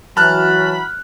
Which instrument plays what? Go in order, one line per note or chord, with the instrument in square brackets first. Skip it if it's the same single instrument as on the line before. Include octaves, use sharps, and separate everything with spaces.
[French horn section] E3 F#3 [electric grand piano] A5 F6 F#6 [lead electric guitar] B5